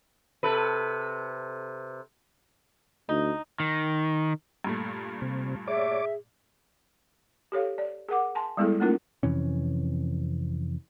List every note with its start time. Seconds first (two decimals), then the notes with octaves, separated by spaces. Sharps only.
0.43 C3 A4 B4
3.09 D2 D#4
3.60 D#3
4.64 G2 A#2 A3
5.22 C3
5.68 G#4 C#5 D5 E5 D6
7.52 G4 A4 C#5 F5
7.78 D5
8.08 G#4 A#4 F#5 D6
8.35 G#5 A5 C6
8.57 G3 G#3 B3 E4 G#4 A4
8.80 A3 A#3 C#4 D#4 F4 A#4
9.23 F2 C3 E3 C#4